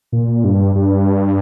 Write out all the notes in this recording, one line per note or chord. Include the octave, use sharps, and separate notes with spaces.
A#2
G2
G2